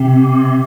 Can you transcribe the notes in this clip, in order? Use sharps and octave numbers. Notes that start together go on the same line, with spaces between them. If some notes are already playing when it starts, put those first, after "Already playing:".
Already playing: C3